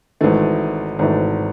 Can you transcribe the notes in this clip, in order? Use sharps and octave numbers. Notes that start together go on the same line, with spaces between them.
G#1 G#2 E3 A3
G#1 G#2 E3 A3